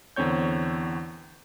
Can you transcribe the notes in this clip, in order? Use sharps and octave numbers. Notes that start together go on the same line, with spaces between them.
E2 D3 C4 C#5 G6